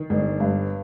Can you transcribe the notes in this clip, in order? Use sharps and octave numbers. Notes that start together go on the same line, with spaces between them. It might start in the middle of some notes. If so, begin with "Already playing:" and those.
Already playing: D#3
G1
G2